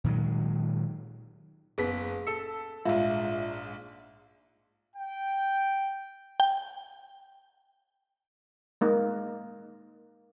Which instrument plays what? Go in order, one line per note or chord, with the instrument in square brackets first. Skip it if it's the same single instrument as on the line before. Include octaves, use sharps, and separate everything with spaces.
[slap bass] A#2 D#3 F#3 G#3
[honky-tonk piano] F#1 B3 B6 [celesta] G#4
[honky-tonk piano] A4 E6 [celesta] C#7
[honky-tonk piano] A#1 G#2 [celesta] F4 E5 F5
[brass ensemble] G5
[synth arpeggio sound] G5
[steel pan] G#3 A#3 D#4